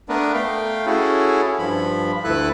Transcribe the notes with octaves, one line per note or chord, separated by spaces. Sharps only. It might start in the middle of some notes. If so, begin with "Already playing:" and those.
A3 B3 D4 A#4 B4
A3 F5 G5
C#4 E4 F#4 G#4 A4
G2 F3 B5
D2 E4 A4 B4 F#6